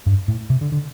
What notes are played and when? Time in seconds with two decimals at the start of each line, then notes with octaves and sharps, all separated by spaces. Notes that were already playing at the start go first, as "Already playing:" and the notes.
0.06 G2
0.28 A2
0.50 C3
0.61 D3
0.72 D3